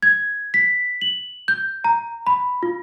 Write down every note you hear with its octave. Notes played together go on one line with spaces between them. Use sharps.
G#6
B6
F#7
G6
A#5
B5
F4